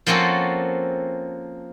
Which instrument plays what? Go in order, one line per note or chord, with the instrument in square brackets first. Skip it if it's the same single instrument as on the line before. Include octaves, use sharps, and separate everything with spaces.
[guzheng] F3 A#3 C4 C#4 F#4 A4